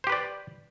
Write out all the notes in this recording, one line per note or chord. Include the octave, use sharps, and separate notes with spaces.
G4 B4 C5 D5